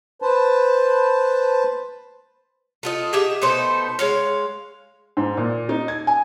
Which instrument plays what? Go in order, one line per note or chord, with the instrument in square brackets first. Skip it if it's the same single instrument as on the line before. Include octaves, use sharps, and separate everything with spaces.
[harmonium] B4 C5 A5
[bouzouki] A3 F4 D#5
G4 G#4 D#5 E5
B2 A3 D#4 C5
G#3 C#5 F5
[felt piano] G#2
A#2
D#4
G#6
G#5